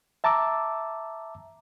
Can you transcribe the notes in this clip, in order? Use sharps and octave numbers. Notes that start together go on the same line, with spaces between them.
E5 A5 A#5 D6 E6